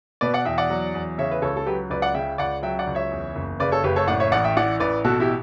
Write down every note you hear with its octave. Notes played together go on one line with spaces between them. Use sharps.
B2 B4 D5
D5 F#5
E2 E5 G5
D5 F#5
F#3
E2
C#3 C#5 E5
B4
C#2 A4 C#5
A4
F#3 G4 B4
C#2 B4 D5
D5 F#5
C#3 E5 G5
C#2 D5 F#5
F#3 E5 G5
D5 F#5
C#2
C#5 E5
E2
F#1
C#3 B4 D5
A4 C#5
F#1 G4 B4
A4 C#5
A2 D5 F#5
C#5 E5
A1 D5 F#5
E5 G5
E3 D5 F#5
A1 B4 D5
B2 F#4 A4
E4 G4